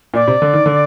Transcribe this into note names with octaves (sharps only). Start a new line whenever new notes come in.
A#2 D5
C3
D3
D#3
D3